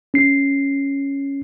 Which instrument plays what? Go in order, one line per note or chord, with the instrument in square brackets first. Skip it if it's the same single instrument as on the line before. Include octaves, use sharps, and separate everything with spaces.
[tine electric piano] C#4 C7